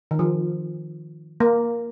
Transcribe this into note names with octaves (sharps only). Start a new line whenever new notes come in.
D#3
F3
A#3